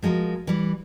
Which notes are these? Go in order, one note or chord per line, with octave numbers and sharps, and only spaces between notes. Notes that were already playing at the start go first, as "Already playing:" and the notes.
F3 G#3 F#4 G#4 A#4
E3 G3